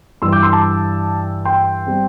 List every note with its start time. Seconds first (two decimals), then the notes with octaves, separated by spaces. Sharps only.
0.22 G2 E3 G3 C6 E6
0.32 D6 G6
0.43 C6 E6
0.53 A5 D6
1.45 G5 C6
1.87 G3 C4